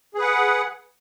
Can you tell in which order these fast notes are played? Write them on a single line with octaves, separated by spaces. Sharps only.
G#4 B4 F#5